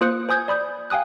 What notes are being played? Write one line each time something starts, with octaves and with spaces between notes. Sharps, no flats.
A#3 F4 C5 D#6 F#6 C#7
C5 G#5 D#6 G6 G#6
D5 B5 D#6 G6
F5 G5 G#5 D#6 F#6